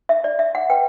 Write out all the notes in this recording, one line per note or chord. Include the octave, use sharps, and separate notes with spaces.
E5
D5
E5
F#5
B4 G5